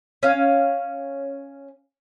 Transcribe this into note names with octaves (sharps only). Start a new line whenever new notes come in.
C#4 F5